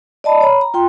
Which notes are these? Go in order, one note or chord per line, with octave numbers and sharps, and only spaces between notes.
D5 D#5 A5 B5
C#5 A#5 B5
A#5
F4 G5 C6